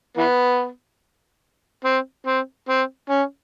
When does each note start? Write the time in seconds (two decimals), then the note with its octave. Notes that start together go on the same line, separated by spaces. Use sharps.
0.17 E3 B3
1.84 C4
2.26 C4
2.69 C4
3.10 C#4